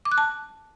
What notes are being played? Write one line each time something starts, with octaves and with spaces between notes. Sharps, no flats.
D6
F#6
A5